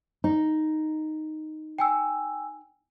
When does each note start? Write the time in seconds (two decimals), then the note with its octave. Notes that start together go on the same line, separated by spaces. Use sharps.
0.24 D#4
1.79 G5 G#5 E6